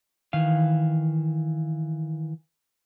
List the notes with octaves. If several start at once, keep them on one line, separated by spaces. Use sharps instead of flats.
D#3 E3 F5